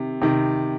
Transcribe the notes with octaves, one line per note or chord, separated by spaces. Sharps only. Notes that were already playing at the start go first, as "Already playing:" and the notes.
Already playing: C3 D#3
C3 D#3